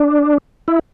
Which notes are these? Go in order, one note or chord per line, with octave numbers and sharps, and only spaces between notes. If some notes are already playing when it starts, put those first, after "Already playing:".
Already playing: D4
E4